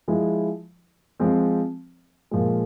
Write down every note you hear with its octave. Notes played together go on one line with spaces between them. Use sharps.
F3 G#3 E4
F3 G#3 C4
A#2 F3 G#3